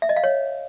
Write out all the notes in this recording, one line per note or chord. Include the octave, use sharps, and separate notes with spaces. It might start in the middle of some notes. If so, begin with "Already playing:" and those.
E5
D#5
F5
C#5